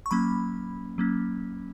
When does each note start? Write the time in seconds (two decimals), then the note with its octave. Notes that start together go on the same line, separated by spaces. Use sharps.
0.06 C#6
0.11 F#3 A#3 C#4 B5
0.98 F#3 A#3 C#4